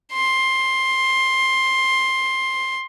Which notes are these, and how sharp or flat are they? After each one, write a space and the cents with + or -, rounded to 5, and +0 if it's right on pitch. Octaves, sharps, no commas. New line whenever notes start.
C6 +10